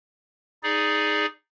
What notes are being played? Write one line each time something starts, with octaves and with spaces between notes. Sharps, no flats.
D#4 G#4 D5